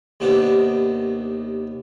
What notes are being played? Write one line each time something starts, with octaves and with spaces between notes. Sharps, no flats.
D#2 C3 B3 D4